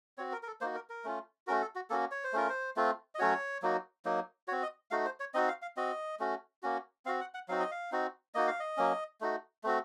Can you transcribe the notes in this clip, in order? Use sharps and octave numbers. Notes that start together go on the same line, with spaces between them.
C4 F#4 C#5
A#4
A#4
A4
A#3 D#4 F#4 C5
A#4
A#4
A3 C#4 F4
A3 C#4 F#4 A#4
A4
F#4
A#3 C#4 F#4 A4
C#5
C5
A3 C#4 F4 A#4
C5
A3 C4 F4
D#5
F#3 A3 C#4 F#4 C#5
F#3 A#3 D#4 F#4
F#3 A#3 D#4
C4 F#4 C#5
D#5
A3 D#4 F#4 F5
C5
C#5
C4 D#4 F#4 D#5
F5
F5
C4 F#4 D#5
A3 C#4 F#4
A#3 C#4 F#4
C4 F#4 F5
F#5
F#5
F#3 C4 D#4 F#4 F5
D#5
F5
C4 D#4 F#4
A#3 D#4 F#4 D#5
F5
D#5
F#3 A#3 C#4
A3 D#4 F#4
A3 C4 F#4